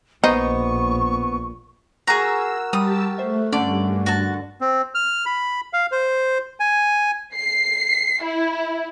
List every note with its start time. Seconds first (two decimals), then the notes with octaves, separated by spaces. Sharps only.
0.24 A#1 A#2 B3 D#4 C5 C#6
2.07 F#4 G#4 A#4 A#5 E6
2.73 G3 G4 A5 D#6 E6
3.18 A3 C5 E5
3.53 G2 D3 A3 C#4 D5
4.06 F#4 A5
4.61 C4
4.95 F6
5.26 B5
5.73 F5
5.92 C5
6.60 G#5
7.34 C7
8.23 E4